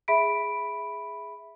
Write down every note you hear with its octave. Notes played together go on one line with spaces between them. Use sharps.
G#4 E5 B5 B6 D7